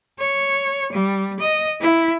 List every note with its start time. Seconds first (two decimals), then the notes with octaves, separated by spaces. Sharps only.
0.19 C#5
0.93 G3
1.40 D#5
1.80 E4